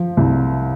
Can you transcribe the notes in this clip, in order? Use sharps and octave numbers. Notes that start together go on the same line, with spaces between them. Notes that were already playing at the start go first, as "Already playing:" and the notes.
Already playing: F3
C2